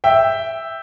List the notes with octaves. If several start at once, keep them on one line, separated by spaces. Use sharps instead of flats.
E5 G5